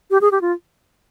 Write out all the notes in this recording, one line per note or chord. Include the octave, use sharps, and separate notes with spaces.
G4
G#4
G4
F4